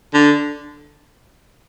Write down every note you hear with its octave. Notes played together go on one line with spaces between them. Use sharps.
D3